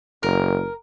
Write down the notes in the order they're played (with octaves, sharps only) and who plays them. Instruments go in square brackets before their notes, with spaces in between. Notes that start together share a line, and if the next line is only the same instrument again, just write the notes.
[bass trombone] F#1 [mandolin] A#4